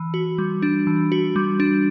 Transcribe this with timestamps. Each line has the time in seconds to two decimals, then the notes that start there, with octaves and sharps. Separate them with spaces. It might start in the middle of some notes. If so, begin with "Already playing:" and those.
Already playing: E3
0.14 F#4
0.38 G3
0.62 D4
0.87 E3
1.12 F#4
1.36 G3
1.60 D4